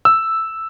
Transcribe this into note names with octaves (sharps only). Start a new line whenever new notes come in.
E6